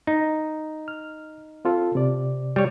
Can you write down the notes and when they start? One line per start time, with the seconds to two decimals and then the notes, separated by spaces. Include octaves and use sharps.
0.07 D#4
0.88 F6
1.65 C4 F4 A4
1.95 C3 D5
2.56 G3 C#5